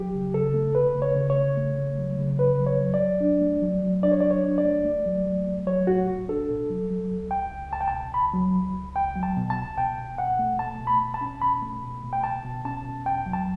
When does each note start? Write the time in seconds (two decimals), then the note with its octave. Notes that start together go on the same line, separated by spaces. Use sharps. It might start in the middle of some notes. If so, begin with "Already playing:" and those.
Already playing: F#3 G4
0.14 C#3
0.34 C#3 A4
0.54 A3
0.75 A3 B4
0.95 C#3
1.02 C#5
1.15 C#3
1.30 C#5
1.37 C#3
1.57 A3
1.77 C#3
1.98 F#3
2.18 C#3
2.39 C#3 B4
2.60 F#3
2.67 C#5
2.81 F#3
2.94 D5
3.00 F#3
3.21 D4
3.41 A3
3.62 F#3
3.83 F#3
4.03 D4 D5
4.12 C#5
4.20 F#3 D5
4.31 C#5
4.44 D4
4.58 D5
4.65 A3
4.85 A3
5.06 F#3
5.27 F#3
5.47 A3
5.67 F#3 C#5
5.87 A2 F#4
6.08 A2
6.28 D4 A4
6.49 B2
6.70 F#3
6.90 F#3
7.11 C#2
7.31 C#2 G5
7.51 C#2
7.72 C#2 A5
7.81 G5
7.88 A5
7.93 B2
8.14 C#2 B5
8.34 F#3
8.54 C#2
8.75 C#2
8.95 C#2 G5
9.16 F#3
9.23 A5
9.36 B2
9.50 A5
9.56 C#2
9.77 B2 G5
9.98 B2
10.18 B2 F#5
10.39 A3
10.59 B2 A5
10.80 B2
10.87 B5
11.01 B2
11.14 A5
11.21 C#4
11.42 B2 B5
11.62 A3
11.82 B2
12.03 B2
12.13 G5
12.24 B2 A5
12.45 B2
12.65 C#4 A5
12.85 B2
13.06 E2 G5
13.26 F#3
13.33 A5